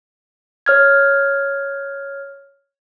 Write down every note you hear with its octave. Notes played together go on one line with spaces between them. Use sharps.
C#5 F6 G#6